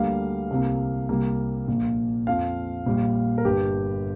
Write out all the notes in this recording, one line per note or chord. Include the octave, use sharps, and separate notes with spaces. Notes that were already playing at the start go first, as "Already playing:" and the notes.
Already playing: D2 D3 G3 A#3 F5
C2 C3 A#3
C2 C3 G3 A#3
A#1 A#2 A#3
F2 F3 C4 F5
A#1 A#2 G3
A#4
G1 G2 G3 G4